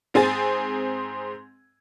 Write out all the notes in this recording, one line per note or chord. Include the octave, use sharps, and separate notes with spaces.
G#2 C4 G#4 G#5 A6